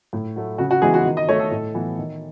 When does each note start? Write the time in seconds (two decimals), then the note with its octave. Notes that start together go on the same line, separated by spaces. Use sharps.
0.13 A2
0.36 F#3 A3
0.58 C#3 F#4
0.71 F#4
0.82 E3 G#3 B3 G#4
0.94 F#4
1.05 D#3
1.17 D#5
1.29 A3 C#5
1.39 A4
1.51 A2
1.74 E3 B3
1.98 D#3